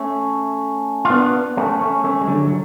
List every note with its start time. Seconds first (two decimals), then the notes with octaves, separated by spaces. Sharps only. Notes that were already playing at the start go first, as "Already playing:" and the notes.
Already playing: A3 C#4
1.05 F4
1.10 B3 D4
1.57 A3 C#4
1.81 A3 C#4
2.04 A3 C#4
2.21 G#3
2.28 D3 F#3
2.47 F#3